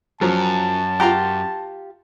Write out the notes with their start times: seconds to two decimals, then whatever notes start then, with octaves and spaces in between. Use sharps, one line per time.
0.21 F#2 F3 F#3 A5
1.00 F4 G4 F#5 A#5 C6